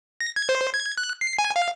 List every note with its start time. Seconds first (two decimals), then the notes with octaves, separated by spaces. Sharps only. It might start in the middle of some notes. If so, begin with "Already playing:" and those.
0.21 A#6
0.36 G#6
0.49 C5
0.74 G#6
0.98 F#6
1.21 C7
1.39 G#5
1.56 F5